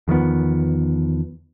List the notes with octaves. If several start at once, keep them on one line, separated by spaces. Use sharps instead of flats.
E2 D#3 F3 B3